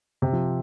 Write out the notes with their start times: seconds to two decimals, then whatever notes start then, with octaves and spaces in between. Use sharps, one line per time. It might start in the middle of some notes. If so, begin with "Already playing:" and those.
0.22 C3
0.33 F3